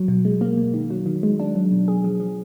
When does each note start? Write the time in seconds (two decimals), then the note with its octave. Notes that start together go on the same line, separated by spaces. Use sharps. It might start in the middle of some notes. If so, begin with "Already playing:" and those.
Already playing: F#3
0.08 B2
0.25 G#3
0.41 A#3
0.57 B2
0.74 D#3
0.90 F#3
1.06 D#3
1.23 G#3
1.40 D4
1.55 F#3
1.72 B2
1.88 G#4
2.04 F3
2.20 F3